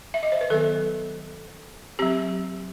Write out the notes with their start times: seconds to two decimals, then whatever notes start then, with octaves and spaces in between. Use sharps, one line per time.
0.14 E5
0.23 D#5
0.32 C5
0.41 B4
0.50 D#3 F#3 B3 A4
1.99 F#3 C4 G4